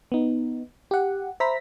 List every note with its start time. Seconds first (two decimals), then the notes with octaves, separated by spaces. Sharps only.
0.12 B3 D#4
0.91 G4 F#5
1.40 C5 E5 A#5 B5 A#6 B6